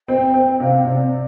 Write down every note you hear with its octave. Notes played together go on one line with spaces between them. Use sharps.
C4 G5
C4
C3 F5
C3 D5